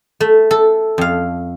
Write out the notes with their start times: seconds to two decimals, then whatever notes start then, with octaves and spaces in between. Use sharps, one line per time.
0.20 A3
0.51 A4
0.98 F2 F5